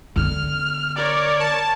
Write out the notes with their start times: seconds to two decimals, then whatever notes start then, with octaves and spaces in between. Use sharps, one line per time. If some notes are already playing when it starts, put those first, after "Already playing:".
0.16 D3 B3 F6
0.96 A#4 C#5 D5
1.40 A5